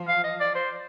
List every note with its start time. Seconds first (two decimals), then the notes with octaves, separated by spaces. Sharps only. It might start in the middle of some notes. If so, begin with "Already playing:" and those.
Already playing: F3
0.08 F5
0.24 D#5
0.40 D5
0.55 C5